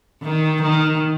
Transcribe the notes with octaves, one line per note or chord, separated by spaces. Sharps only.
D#3
D#3